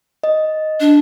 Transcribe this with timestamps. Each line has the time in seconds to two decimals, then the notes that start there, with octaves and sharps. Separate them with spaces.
0.24 D#5
0.80 D4